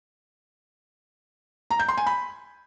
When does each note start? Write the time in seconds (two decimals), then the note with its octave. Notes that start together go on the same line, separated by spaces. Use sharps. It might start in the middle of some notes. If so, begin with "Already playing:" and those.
1.71 A#5
1.79 G6
1.88 C6
1.97 G#5
2.06 B5